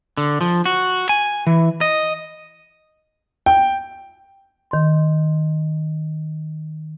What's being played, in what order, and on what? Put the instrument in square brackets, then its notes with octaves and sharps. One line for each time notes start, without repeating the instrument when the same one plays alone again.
[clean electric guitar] D3
F3
F#4
G#5
E3
D#5
[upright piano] G5
[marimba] D#3 C6